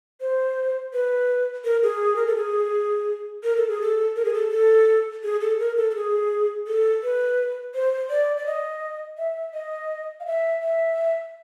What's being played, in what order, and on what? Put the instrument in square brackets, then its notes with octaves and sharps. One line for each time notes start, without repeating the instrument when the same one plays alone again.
[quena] C5
B4
A#4
G#4
A#4
A4
G#4
A#4
A4
G#4
A4
A#4
G#4
A4
A4
G#4
A4
A#4
A4
A4
G#4
A4
B4
C5
D5
D5
D#5
E5
D#5
F5
E5
E5